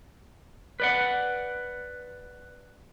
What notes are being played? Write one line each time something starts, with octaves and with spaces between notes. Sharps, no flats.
B4 D5 F#5